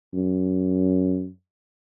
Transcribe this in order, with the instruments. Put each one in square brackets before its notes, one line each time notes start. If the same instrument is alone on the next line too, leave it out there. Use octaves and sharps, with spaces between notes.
[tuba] F#2